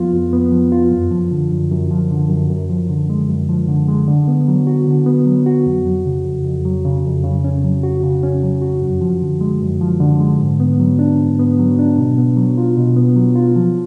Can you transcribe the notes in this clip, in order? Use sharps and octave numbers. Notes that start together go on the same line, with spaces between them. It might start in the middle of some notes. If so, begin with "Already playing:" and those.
Already playing: F2 F3 B3 F4
F2
B3
F3
F4
F#2
F3
D3
F#2
F#2
F3
D3
F#2
F#2
F3
D3
G#3
F#2
F3
D3
G#3
D3
B3
F#3
F#4
D3
B3
F#3
F#4
F2
F#3
C#3
F2
F2
F#3
C#3
F2
C#3
C#4
F#3
F#4
C#3
C#4
F#3
F#4
F#2
F3
D3
G#3
F#2
F3
D3
G#3
G#2
B3
F#3
D4
G#2
B3
F#3
D4
B2
B3
F#3
F4
B2
B3
F#3
F4
F3